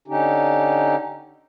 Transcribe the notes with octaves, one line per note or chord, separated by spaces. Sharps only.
D3 C#4 D#4 G4